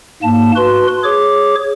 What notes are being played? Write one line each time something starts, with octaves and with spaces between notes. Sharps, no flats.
G#2 A#3 A5
F#4 B4 C6
G#4 C#5 D6